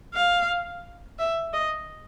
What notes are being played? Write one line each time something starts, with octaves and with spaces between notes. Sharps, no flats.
F5
E5
D#5